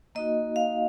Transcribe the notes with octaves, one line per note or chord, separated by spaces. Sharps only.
A#3 D#4 F#4 D#5
F5